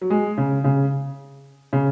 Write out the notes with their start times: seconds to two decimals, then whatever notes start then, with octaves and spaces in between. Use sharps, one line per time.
0.01 F#3
0.10 G#3
0.38 C#3
0.64 C#3
1.73 C#3